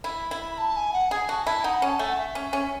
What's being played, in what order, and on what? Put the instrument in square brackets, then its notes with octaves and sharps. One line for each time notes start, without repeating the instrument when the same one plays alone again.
[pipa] E4 [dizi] B5
[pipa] E4
[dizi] B5
A5
G#5
F#5
[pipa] G#4 [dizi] G#5
[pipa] F#4 [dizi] A5
[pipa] E4 [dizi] A5
[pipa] D#4 [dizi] F#5
[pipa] C#4
[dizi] A5
[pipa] A3 [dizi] G#5
[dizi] F#5
E5
[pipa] C#4
C#4